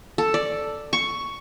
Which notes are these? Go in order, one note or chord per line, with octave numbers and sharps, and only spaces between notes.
A4
D5
C#6